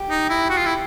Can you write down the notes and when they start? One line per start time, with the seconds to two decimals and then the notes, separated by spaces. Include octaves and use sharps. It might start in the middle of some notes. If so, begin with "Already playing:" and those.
Already playing: G4
0.10 D#4
0.30 E4
0.50 F#4
0.57 F4
0.66 E4